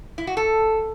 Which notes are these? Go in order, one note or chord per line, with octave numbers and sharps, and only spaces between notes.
E4
F#4
A4